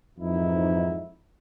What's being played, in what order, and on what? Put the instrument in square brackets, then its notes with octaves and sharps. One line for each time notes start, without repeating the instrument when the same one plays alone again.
[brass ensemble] F2 G#2 E3 D#4 E4 E5